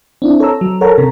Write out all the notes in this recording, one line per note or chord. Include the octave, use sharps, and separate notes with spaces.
C4 D4 E4
A4 C#5 A#5 E6
F#3
A4 A#4 C#5 F#5 A5 A#5
C3